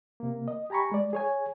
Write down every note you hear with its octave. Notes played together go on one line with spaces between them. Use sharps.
C3 A#3
D#5
G4 G#5 A#5 B5 C#6
G#3 D5
G#4 C#5 G#5